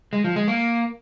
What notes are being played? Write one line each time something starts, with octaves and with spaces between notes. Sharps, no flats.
G#3
F3
G#3
A#3